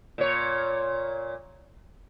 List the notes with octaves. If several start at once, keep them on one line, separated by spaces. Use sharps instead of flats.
A#2 C#5